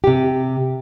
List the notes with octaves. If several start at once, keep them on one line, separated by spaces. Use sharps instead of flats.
C3 G4